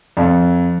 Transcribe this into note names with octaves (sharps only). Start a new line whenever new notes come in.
F2